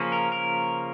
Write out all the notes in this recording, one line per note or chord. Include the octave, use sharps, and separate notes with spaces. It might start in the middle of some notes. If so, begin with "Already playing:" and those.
Already playing: C#3 F3 A#3 C#4
A#4
A#4